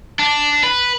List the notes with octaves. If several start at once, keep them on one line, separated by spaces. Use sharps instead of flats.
D4
B4